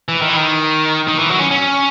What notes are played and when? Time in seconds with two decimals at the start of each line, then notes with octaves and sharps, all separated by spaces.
0.09 E3
0.22 D#3
0.29 E3
0.36 D#3
1.07 D#3
1.19 E3
1.30 F#3
1.39 C#4
1.51 C#4